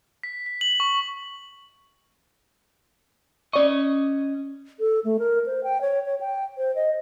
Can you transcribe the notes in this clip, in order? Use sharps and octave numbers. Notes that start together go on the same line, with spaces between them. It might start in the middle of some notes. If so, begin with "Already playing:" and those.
B6
B6
F#7
C#6
C#4 D5 D#5 C#6
A4
A3
A#4
C5
G5
C#5
C#5
G5
C5
D#5